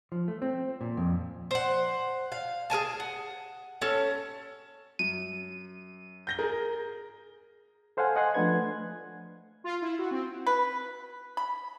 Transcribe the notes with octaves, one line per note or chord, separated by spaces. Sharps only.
F3
A3
C4
A#2
F2
C5 F#5
F5
G#4 A#4 G#5 A5
F#5
C#4 A4
F#2 D#7
G6 A#6 G7
G#4 A#4
A4 C5 F5 F#5 G#5
D#5 F#5 G#5 C6 F#6
F3 A3 D4 B4 G#6
F4
E4
F#4
C4
B4
B5